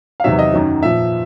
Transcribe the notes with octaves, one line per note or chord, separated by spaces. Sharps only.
F5
E2 C3 D#3 F#3 E5
D#5
F#2 D#3 F#3
A#2 F3 E5